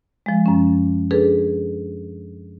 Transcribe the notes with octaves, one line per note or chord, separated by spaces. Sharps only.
F3 G#3
F#2 C#4
D4 G#4 A4 B4